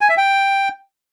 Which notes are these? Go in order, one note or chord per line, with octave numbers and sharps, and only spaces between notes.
G#5
E5
G5